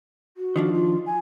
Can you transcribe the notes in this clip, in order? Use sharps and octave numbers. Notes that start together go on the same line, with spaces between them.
F#4
D#3 F3 D4
F4
G#5